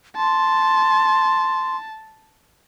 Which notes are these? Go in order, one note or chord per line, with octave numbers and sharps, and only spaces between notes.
A5 C6